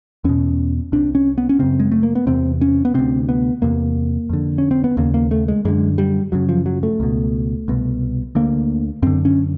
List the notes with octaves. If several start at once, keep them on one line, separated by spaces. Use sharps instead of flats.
E2 B2 C#4
C2 C3 D4
C#4
B3
C#4
F#2 C#3 C4
G#3
A3
A#3
B3
E2 C3 C4
C#4
B3
D2 C3 C4
B3
E2 C3 A#3
F2 D3
C#4
C4
B3
D#2 C#3 A#3
A#3
A3
G#3
F#2 D3 G#3
G3
F#2 C#3 F#3
F3
F#3
A3
C#2 B2
C2 B2
D2 D3 A#3
F#2 D3 C4
C#4